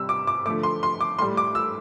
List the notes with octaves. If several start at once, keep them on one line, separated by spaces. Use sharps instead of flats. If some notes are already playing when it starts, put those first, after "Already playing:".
Already playing: C3 G3 E6
D6
D6
D3 F3 A3 D6
C6
C6
D6
A2 G3 C6
D6
E6